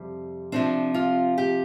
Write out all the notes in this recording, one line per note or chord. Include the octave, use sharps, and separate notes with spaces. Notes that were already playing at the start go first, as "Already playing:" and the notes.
Already playing: F2 C3 G3
C3 F3 C4 D4
F4
G4